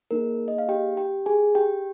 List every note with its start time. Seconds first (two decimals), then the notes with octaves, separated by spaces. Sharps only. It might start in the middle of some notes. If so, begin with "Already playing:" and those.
0.11 A#3 D#4 G#4 A#4
0.48 D#5
0.58 F5
0.69 G4 G5
0.97 G4 G5
1.26 G#4 G#5
1.55 G4 G5